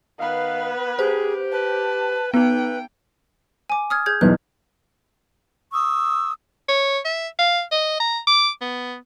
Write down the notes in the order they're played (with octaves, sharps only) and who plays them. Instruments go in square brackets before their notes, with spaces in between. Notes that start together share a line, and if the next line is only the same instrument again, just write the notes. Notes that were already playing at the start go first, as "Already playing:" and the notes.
[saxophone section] D#3 D#5 F5 [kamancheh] B3 B4
[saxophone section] G4 [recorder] G#4 [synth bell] C5
[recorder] B4 [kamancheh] A5
[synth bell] B3 D#4 [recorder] B4 [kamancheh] G5
[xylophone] G#5 D6
D#6 F6 G#6
G#4 G6 G#6
[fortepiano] B1 E2 [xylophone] F#6
[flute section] C#6 D#6 E6
[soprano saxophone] C#5
E5
F5
D#5
A#5
D6
B3